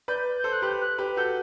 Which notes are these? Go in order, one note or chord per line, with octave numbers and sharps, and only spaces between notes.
B4 D5 G6
A4 C5 G6
F#6
G4 B4
G6
F#6
G4 B4
F#4 A4 G6